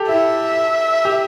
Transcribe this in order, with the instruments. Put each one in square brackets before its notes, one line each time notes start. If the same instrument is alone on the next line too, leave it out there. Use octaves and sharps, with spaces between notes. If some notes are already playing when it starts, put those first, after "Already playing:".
Already playing: [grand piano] G4 A4
[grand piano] E4 [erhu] E5
[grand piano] G4